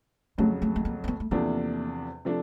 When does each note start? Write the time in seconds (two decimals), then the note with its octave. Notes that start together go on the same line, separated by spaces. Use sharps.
0.38 F2 C#3 F#3 A3
0.62 A3
0.76 A3
0.85 A#3
1.04 C4
1.08 B3
1.20 A3
1.31 E2 C3 F3 A3 A#3 D4
2.25 C3 F3 A3 D4